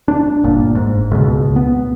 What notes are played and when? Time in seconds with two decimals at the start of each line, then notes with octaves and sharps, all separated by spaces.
0.08 D4
0.43 G1 A#2
0.75 G#2
1.11 C#2 B2
1.56 B3